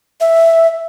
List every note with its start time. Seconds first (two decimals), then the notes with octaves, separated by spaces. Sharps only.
0.21 E5